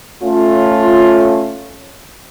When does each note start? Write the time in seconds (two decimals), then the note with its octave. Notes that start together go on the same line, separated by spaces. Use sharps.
0.23 A3 C#4 F4